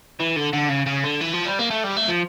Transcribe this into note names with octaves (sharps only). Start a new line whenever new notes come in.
E3
D3
D3
C#3
C#3
D3
E3
F3
G3
A#3
A3
G3
A3
F3